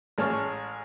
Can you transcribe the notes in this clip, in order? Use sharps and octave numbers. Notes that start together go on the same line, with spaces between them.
A1 G#3 C#5 A5 C#6 F6